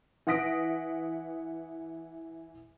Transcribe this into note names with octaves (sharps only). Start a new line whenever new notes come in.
E3 F#5 D#6 A#6 B6 D7